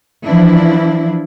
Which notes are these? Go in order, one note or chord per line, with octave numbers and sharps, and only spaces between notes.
E3 F3 D4 E4